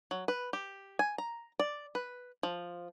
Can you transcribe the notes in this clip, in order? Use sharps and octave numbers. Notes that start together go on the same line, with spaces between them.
F#3
B4
G4
G#5
A#5
D5
B4
F3